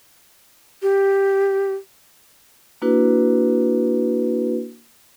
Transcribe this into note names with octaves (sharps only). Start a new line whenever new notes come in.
G4
A#3 D4 E4 F#4 B4